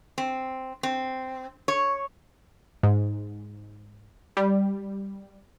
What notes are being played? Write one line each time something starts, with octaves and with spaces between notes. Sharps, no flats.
C4
C4
C#5
G#2
G3